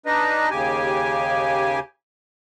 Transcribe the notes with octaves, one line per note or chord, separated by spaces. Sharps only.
D4 D#4 B4 D#5
D#2 C#3 G4 G#5